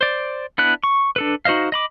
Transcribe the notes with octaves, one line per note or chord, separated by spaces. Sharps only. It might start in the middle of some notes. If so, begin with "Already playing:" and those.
C5 D5
B3 D4 E4 F#6
C#6
D4 A4 B4
D#4 F#4 C5 D#5 F5
D#5 B5 D6